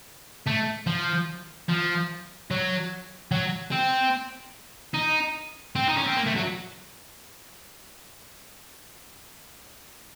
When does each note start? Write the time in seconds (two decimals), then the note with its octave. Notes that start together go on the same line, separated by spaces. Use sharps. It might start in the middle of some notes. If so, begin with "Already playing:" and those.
0.47 A3
0.87 F3
1.69 F3
2.51 F#3
3.32 F#3
3.71 C4
4.94 D#4
5.75 C4
5.89 D#4
5.97 C#4
6.07 C4
6.17 A#3
6.27 A3
6.36 F#3